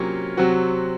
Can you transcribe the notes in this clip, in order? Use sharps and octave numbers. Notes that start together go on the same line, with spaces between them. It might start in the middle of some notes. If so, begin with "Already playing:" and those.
Already playing: C3 F#3 A#3 C#4 F4
C3 F#3 C4 F#4